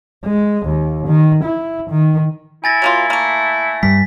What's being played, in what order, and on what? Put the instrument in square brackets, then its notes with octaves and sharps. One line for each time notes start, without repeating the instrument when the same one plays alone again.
[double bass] G#3
D#2
D#3
E4
D#3
[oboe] E4 [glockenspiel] G#5 A6 A#6
[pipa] F#3 A#3 F4
A3 A#3
[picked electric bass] G2 G3 [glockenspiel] B6